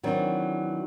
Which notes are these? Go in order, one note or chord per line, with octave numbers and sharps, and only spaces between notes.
D#3 E3 F#3 C4 D4